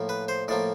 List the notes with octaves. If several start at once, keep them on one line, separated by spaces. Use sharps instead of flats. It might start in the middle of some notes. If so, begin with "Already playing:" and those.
Already playing: A2 F3 A#3
B4
C5
A2 F3 A#3 D5